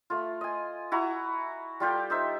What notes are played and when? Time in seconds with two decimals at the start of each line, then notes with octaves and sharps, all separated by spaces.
0.10 A3 F4
0.41 D#5 G#5
0.92 E4 F#4 A#5
1.80 G3 F4 G4 A4
2.10 D#4 C5 E5